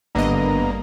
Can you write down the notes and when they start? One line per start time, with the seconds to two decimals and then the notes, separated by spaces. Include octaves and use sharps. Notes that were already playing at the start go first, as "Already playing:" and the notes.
0.15 G#1 G2 D3 A#3 B3 D#5 A#5 A#6